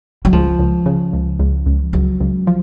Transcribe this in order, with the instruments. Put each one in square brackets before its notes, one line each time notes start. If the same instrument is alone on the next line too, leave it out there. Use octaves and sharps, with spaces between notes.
[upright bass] F#3
[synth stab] C#2 [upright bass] F3
[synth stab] C#2
C#3
C#2
C#2
C#2
[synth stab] C#2 [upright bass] F#3
[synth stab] C#2
F3